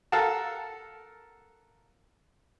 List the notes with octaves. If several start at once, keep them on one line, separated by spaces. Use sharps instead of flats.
A4 A#4 F5 F#5 A5